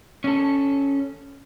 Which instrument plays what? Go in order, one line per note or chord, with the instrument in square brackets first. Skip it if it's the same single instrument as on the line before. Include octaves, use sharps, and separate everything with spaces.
[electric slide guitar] C#4 A4